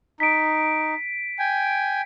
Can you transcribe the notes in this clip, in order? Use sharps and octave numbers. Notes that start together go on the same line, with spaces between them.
D#4 B6 D7
G5 G#5